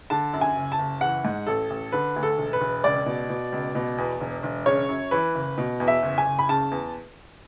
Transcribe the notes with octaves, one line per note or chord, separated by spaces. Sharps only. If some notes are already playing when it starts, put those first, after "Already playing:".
D3 A5
F#2
G#5
F#1
A5
F#1
E3 F#5
G#2
A1 A4
A1
D3 B4
D2
A4
E1
B4
E1
C#2 D5
B2
B2
C#2
B2
E2
E1
E1
C#3 C#5
F#2
E3 B4
F#1
B2
E2
E5
F#1
G#5
F#1
B5
C#3 A5
E2